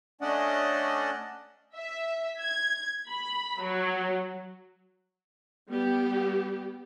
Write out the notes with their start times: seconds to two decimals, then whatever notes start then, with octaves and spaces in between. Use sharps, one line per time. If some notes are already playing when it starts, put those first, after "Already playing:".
0.21 A3 C#4 D4 D5 D#5 F#5
1.76 E5
2.40 G#6
3.09 B5
3.62 F#3
5.69 G3 B3 G4